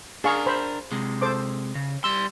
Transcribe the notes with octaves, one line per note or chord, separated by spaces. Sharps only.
D4 G#4 A#4 F5 C#6
C5 B5
C3 G#3
A4 C5 D6
C#3
G3 C6 E6